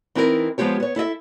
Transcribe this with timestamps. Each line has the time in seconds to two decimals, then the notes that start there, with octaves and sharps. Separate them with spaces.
0.15 E3 C4 D#4 E4 A4 A#4
0.58 F3 G#3 B3 F4 G4 C#5
0.80 B3 C#5
0.96 E4 A4 D#5 E5